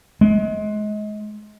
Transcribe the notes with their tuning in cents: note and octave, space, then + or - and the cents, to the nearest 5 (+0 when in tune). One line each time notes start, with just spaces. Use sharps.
G#3 +30